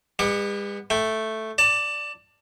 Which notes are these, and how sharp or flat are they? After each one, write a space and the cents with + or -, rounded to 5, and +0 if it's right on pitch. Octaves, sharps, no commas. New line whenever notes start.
G#3 -45 B3 +0 D6 +30
A3 +0 G5 +0
D5 +0 A5 +20